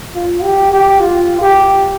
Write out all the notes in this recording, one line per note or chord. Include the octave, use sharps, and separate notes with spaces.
F4
G4
G4
F4
G4